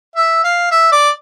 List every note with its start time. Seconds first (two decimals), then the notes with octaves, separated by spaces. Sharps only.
0.16 E5
0.44 F5
0.71 E5
0.92 D5